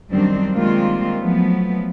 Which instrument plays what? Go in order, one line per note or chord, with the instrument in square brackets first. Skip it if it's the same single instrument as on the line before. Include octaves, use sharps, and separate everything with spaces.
[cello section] F#2 D#3 G3 C4 D4
D#3 G3 G#3 A#3 C4 F4
F3 F#3 A3 B3